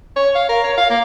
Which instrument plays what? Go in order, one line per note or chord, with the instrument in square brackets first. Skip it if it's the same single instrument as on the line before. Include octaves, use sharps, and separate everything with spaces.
[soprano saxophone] C#5
F5
A#4
C#5
F5
A#3